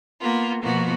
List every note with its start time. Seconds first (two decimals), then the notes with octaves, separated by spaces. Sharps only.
0.21 A#3 B3 F4
0.62 B2 F3 A#3 B3 F#4